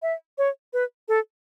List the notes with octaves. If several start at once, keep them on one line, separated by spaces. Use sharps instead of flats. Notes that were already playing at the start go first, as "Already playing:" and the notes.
E5
C#5
B4
A4